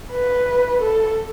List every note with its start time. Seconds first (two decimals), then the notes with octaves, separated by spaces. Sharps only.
0.13 B4
0.82 A4